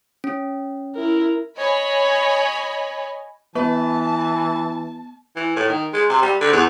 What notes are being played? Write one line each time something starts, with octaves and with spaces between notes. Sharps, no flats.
C#4
E4 A#4
C#5 D#5 G#5 B5
E3 B3 B4 A5
E3
A2
D#3
G#3
C3
G3
D3
E2